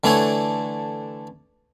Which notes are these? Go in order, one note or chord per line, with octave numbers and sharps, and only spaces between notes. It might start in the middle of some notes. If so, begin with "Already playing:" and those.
D3 E3 A3 D4 E4 C#5